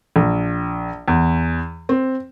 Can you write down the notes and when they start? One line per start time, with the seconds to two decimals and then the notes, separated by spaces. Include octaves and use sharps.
0.16 A#1
1.08 E2
1.89 C4